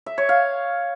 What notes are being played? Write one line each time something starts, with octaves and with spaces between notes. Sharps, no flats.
E5
C#5
F5